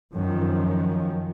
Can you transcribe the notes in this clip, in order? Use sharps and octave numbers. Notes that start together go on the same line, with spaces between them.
F#2 D#3 F3